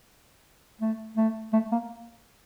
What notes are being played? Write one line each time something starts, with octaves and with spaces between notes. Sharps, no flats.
A3
A3
A3
A#3